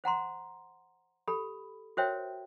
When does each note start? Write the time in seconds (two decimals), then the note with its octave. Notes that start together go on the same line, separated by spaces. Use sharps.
0.04 C5 F#5 A#5 C6
1.27 G4 A4 B5
1.97 F#4 A#4 C5 C#5 E5 G5